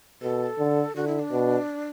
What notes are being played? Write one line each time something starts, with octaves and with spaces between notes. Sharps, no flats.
B2 A4
D3
D3 F#4
E4
D4
B2